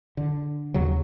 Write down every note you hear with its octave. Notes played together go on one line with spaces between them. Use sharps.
D3
D#2 C#3 F#3